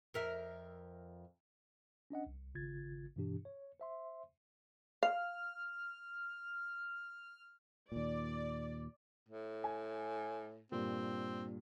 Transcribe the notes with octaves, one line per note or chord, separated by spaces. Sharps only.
F2 A#4 E5
C#4 D4 D#5 F#5
C2
G#1 C#3 F4 G#6 A6
G2 B2 E3 D4 G4
C#5
C5 E5 C6
F5 F6
D#2 A#2 D5
A2
G#5
G2 A#2 C4